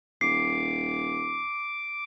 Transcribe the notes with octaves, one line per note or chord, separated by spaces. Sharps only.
D#1 D6 C7